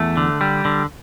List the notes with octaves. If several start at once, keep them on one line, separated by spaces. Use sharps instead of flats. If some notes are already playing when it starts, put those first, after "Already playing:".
Already playing: E2 A3
D3
G3
D3